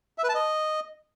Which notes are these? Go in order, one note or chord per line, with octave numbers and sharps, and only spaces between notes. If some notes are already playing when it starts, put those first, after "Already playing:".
E5
B4
A5
D#5